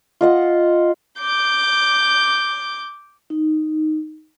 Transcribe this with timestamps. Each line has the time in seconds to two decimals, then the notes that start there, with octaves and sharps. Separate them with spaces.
0.21 F4 D#5 F#5
1.20 D6 G6
3.30 D#4